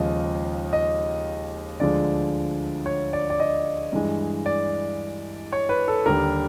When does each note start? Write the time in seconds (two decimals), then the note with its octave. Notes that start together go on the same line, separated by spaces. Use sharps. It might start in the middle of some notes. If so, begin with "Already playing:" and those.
Already playing: D#2 C#3 F3 G#3 D#5
0.73 D#5
1.80 D2 D3 F3 G#3 D5
2.86 C#5
3.13 D5
3.30 D5
3.40 D#5
3.93 G2 E3 G#3
4.46 D5
5.53 C#5
5.69 B4
5.88 A4
6.06 D#2 D3 G3 A#4